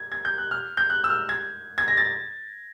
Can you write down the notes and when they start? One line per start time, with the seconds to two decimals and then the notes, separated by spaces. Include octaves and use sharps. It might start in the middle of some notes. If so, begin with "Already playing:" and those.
Already playing: G#6
0.12 G#6
0.25 G6
0.38 F#6
0.51 F6
0.77 G6
0.90 F#6
1.04 E6
1.10 F6
1.29 G#6
1.78 G#6
1.88 A#6
1.97 A6